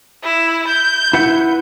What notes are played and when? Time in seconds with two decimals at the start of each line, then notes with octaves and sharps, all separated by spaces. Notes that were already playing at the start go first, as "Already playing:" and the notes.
0.24 E4
0.68 G6
1.13 E4 B4 F#5